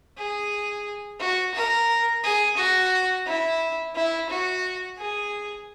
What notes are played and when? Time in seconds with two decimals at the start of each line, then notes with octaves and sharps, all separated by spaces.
0.17 G#4
1.20 F#4
1.55 A#4
2.24 G#4
2.57 F#4
3.26 E4
3.95 E4
4.29 F#4
4.98 G#4